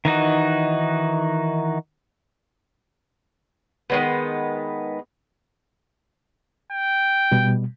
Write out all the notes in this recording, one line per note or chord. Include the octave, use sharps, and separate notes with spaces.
D#3 E3 D#4 F#4
D#3 G#3 B3
G5
B2 G3